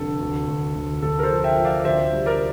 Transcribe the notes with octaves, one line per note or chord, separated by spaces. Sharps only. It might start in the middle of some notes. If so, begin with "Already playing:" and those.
Already playing: F1 D3 A4
D2
D2
D2
D2 A4
A#4
A4 C5
F3
E5 G5
F3
D5 F5
D5
D2 C5 E5
G3
A#4 D5